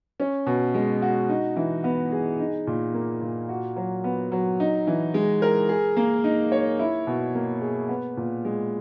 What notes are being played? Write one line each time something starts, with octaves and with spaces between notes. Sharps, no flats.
C#4
B2
G#3
F#4
D#4
E3
B3
G#4
D#4
A#2
A#3
A#2
F#4
F#3
B3
F#3
D#4
E3
G#3
A#4
G#4
A#3
D#4
C#5
E4
B2
A#3
G#4
B3
A#2
G#3